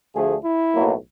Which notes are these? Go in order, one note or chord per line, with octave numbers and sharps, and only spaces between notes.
D2 D3 F3 A3 G#4
E4
B1 A2 F#3 A#3